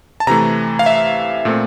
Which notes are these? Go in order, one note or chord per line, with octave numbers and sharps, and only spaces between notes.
A5
C3 E3 A3 A#5
F5
E5
A#2 A3 C4